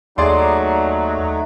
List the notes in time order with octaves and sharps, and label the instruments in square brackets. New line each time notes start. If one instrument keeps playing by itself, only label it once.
[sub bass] D#2 [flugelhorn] F#3 [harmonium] A3 D#4 [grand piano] G#4 D5 C6